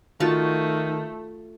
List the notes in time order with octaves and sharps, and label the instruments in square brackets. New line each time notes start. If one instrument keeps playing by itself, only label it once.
[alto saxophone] D#3 [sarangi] A3 [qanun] F4 F#4 A5